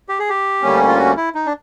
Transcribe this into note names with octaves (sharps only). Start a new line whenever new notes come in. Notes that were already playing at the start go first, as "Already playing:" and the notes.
G4
G#4
G4
D2 D3 G3 A#3 C#4
F4
F#4
E4
D#4
D4